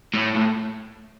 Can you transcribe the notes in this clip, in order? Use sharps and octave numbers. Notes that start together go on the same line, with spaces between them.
A2
A2